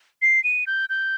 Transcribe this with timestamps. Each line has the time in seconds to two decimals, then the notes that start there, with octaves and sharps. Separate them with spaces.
0.22 C7
0.44 D#7
0.67 G6
0.89 G6